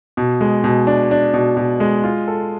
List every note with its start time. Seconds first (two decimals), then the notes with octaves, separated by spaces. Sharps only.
0.17 B2
0.41 G#3
0.64 B2
0.87 D4
1.11 D4
1.34 B2
1.57 B2
1.80 G#3
2.04 F4
2.28 A4